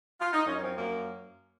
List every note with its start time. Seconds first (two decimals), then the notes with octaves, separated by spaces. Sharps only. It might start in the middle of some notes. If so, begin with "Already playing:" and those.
0.19 F4
0.33 D#4
0.46 F#2 C#4
0.57 C#4
0.61 F3 C4
0.76 F#2 A#3